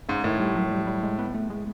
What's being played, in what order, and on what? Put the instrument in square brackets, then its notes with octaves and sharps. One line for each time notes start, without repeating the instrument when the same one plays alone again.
[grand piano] G#2 [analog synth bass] C#3
[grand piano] A2 [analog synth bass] D#3
[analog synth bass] G3
F#3
G3
G3
G#3
B3
A3
G#3